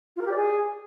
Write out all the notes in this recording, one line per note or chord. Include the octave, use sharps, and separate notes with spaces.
F4
A#4
G4
D5
G#4